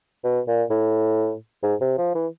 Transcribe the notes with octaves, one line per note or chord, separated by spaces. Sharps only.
B2
A#2
A2
G#2
C3
F3
E3